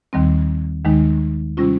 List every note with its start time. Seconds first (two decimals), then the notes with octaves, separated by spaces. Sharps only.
0.13 D#2 D#3 G3 C4
0.85 D#2 D#3 G#3 D#4
1.57 C3 G3 C#4 F4